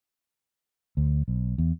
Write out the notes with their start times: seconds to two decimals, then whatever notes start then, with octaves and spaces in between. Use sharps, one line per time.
0.97 D2
1.28 B1
1.58 E2